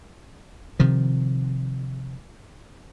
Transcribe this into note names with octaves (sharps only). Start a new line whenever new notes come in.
C3 D#3 F3